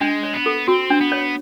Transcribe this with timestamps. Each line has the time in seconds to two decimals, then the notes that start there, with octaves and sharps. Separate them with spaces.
0.01 G#3 D4
0.23 C#5
0.34 B3
0.46 A4
0.68 C4 F#4
0.90 D4
1.01 B3
1.12 C#5